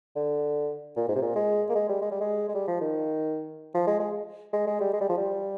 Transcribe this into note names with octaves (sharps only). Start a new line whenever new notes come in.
D3
A#2
G#2
C3
A#2
G#3
A#3
G#3
G3
G#3
G3
G#3
G#3
G3
F3
D#3
F3
G#3
G#3
G#3
G#3
G3
G#3
G3
F3
G3